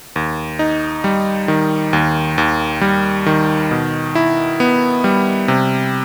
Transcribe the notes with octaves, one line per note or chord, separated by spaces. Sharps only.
D#2
D#4
G3
D#3
D#2
D#2
G3
D#3
B2
E4
B3
G3
C3